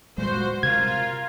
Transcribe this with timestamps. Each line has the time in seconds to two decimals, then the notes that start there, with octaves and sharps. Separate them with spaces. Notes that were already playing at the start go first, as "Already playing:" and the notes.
0.18 A#2 G3 G#3 B3 F4 F#4 C5
0.63 C3 F4 A#4 F5 G#6